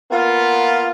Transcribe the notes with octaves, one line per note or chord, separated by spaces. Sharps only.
A#3 B3 F4